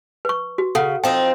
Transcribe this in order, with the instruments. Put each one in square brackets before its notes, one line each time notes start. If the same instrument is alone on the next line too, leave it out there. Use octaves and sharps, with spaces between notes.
[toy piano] B4 C#6
F#4
[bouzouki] C#3 [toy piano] A4 F#5
[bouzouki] F3 C4 D#4 [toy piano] G5